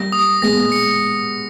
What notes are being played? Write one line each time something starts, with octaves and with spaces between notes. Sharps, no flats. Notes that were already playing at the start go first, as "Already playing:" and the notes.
Already playing: G3 A#3 A#6
D#6
G#3 B3 A#6
C#7